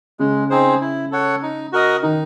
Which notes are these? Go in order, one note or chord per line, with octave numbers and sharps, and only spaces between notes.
C#3 G#3
C4 D#4 G#4 C5
E4
A4 C#5 F#5
D#4
F#4 A#4 D#5
D#3 D#4